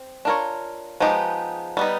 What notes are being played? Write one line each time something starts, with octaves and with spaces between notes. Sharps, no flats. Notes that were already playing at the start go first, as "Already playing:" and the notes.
Already playing: C4
D4 F4 A#4 C#5
F3 G#3 B3 D#4 G4
G3 B3 D#4